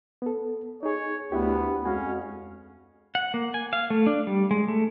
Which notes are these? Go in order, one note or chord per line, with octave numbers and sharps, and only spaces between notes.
B3 A4
D#4 G#4 C#5
D2 B3 D4 E4 G4
F2 G#3 C#4 F#4 F5 G#5
F#5
A#3
G#5
F5
A3
D4
G3
G#3
A3